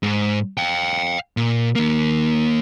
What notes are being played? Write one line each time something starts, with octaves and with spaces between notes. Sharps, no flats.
G#2
F5 G5
A#2
D#2 A#3